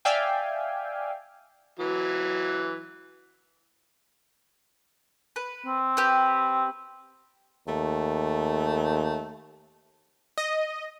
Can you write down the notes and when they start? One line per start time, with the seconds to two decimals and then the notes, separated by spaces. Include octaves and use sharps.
0.05 D5 E5 F5 G5 G#5
1.79 E3 F#3
5.36 B4
5.66 C4
5.97 G4 B4
7.68 D#2 A3
10.38 D#5